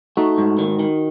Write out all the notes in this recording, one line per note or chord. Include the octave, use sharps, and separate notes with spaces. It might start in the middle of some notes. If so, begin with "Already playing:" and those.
A3 D#4 F#4
G#2
D#3
D#3